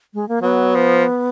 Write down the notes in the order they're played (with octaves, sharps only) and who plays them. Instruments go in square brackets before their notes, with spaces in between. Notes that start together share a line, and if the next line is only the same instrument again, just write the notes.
[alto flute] G#3
A#3
[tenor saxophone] F#3 [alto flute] B3
[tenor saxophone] F3